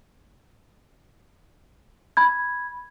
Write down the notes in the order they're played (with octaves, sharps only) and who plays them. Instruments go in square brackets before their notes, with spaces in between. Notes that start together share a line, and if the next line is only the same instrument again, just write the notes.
[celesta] B5 G#6